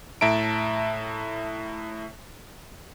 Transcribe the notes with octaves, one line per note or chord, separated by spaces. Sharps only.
A2 E5 A5 A#5 D7